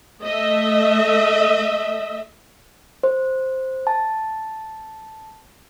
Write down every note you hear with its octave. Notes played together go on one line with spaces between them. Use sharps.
A3 D#5 E5
C5
A5